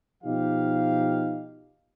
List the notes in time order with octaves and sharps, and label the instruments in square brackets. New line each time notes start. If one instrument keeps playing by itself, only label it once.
[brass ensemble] B2 F3 D#4 G4 F5